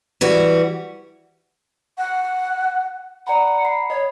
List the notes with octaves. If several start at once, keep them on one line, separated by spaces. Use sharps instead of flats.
E3 G3 F#4
F#5
D5 F#5 A#5 B5
B5 C7
C#5 D#5